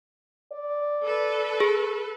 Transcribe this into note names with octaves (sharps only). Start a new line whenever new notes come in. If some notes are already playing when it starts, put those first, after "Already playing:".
D5
A4 B4
G#4